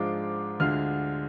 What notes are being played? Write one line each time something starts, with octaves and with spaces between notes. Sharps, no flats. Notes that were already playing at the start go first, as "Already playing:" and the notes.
Already playing: G#2 F3 G#3 D4 F4 D6
D2 D3 G#3 D4 F4 F6